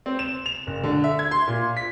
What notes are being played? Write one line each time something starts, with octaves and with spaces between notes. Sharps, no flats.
C4
E7
F7
F#1
D3
E5
G#6
C6
A#2
B6